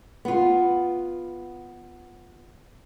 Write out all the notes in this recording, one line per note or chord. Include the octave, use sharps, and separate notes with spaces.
B3 F4